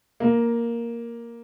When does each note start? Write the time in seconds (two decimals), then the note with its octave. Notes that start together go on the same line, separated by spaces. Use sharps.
0.20 A#3